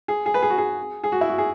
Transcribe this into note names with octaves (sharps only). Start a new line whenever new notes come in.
G#4
G#4
B4
G#4
F#4
G#4
G#4
F#4
E4
F#4
G#4